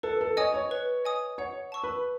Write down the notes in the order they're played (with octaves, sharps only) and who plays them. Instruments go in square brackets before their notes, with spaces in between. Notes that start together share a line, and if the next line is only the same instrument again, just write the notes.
[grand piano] A4 [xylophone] B4
[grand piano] A4
[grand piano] C#5 [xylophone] D#5 G#5 D#6
[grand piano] C#5
[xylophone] B4
D#5 G#5 D#6
[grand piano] C#5 [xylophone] F#5
[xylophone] A5 C#6 E6
[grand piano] B4